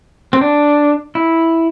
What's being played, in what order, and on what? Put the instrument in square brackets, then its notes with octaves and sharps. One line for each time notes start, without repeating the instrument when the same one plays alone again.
[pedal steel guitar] C4
D4
E4